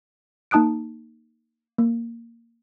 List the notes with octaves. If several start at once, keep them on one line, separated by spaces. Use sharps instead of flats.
A#3 D#4 A5 D#6 F#6 D7
A#3